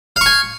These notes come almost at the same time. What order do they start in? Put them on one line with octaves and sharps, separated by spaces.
F5 C#6 G#5